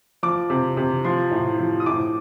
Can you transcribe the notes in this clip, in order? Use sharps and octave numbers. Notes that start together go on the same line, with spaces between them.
F3 D6
C3
C3
F3 C6
A2
F3
D#6
A2 D6